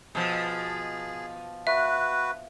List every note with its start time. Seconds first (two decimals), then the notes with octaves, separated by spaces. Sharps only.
0.15 B2 F3 G#4
1.67 F#4 B4 E5